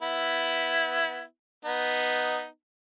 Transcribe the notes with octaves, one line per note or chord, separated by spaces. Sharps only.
B3 E4
B3 D#4